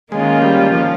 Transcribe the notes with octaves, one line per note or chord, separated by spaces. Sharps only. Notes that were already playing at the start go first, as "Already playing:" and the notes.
D#3 G#3 A#3 C#4 F4
G3
F3